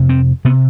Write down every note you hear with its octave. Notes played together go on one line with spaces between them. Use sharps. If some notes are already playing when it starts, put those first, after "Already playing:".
Already playing: F2 C3
C4
C3 B3